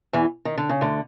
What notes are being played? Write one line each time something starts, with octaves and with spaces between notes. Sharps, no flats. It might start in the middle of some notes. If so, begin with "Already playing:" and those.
E2 E3
D#3
D3
C#3
D2 D3